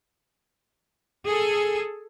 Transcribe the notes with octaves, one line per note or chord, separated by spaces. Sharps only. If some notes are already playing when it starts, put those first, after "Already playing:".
G#4 A4